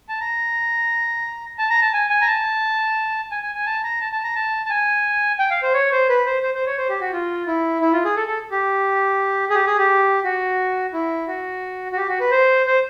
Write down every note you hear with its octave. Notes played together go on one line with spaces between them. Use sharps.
A5
A#5
A5
A#5
A5
G#5
G#5
A#5
A5
G#5
G#5
G#5
A5
A#5
A5
A5
A#5
A5
A5
G#5
G5
F5
C5
C#5
C5
B4
C5
C5
C5
C#5
C5
G4
F#4
F4
E4
E4
F4
G#4
A4
A4
G4
G#4
G4
G#4
G4
F#4
E4
F#4
F#4
G4
F#4
B4
C5
C5